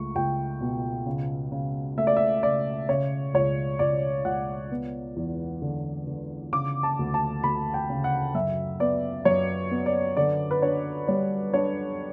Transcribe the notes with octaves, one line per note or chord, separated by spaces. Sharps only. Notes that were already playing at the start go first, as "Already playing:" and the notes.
Already playing: C#2 A3 C#6
C#2 G5
B2
C#3
C#3
A3 E5
D5
E5
C#3 D5
C#3 C#5
C#2 C#5
C#2 D5
C#2 F#5
B3
E2
D3
D3
C#3 D6
A5
D2
A5
D2 B5
G5
C#3
F#5
F#2 E5
B3 D5
F#2 C#5
B3
D5
D3 D5
B4
D4 C#5
G3 C#5
D4 C#5